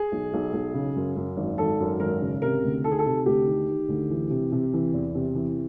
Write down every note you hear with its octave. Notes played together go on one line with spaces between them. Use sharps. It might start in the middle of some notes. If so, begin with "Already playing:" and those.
Already playing: G#4
B1
B1
B1
C#3
F#2
F#2
G#1
G#1 A4
F#2
G#1 A#4
C#3
C3 A#4
D2
D#3 A4
G#4
A4
C3
D2 G4
D#3
D#3
D2
E3
C3
C3
E3
E2
C3
E3